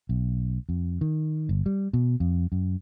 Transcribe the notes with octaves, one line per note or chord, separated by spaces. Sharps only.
B1
F2
D#3
G1
G3
B2
F2
F#2